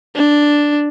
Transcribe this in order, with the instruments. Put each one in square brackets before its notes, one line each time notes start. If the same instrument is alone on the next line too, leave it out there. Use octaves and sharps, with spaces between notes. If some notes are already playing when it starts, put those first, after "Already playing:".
[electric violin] D4